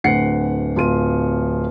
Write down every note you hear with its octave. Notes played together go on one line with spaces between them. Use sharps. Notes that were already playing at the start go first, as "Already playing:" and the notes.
D1 D2 F#5 C7 C#7
D1 F4 C6 D#7